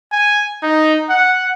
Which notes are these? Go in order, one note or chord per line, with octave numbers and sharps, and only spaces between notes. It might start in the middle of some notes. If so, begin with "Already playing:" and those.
G#5
D#4
F#5